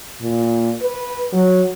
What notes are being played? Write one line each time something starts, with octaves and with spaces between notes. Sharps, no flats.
A#2
B4
F#3